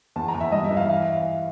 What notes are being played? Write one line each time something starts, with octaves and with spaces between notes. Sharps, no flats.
E2 A5
A#5
E2
E5
G2 D#5
E5
E3
F5
F5